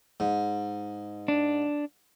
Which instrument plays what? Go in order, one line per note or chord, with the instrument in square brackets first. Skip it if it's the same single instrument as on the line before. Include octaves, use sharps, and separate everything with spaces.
[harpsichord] G#2
[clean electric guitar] D4